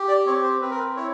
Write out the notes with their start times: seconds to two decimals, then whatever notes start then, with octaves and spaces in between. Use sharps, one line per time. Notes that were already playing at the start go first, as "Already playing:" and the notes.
Already playing: G4
0.08 D5
0.26 C4 C#5
0.44 C5
0.62 C4 B4
0.70 A#4
0.79 B4
0.96 E4 C#5